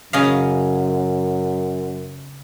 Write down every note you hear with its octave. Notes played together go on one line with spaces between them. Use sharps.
F#2 C#3 D#5 F5